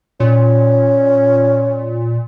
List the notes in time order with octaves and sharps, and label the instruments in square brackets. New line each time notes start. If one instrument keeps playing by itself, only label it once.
[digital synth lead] A#2 [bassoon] C#4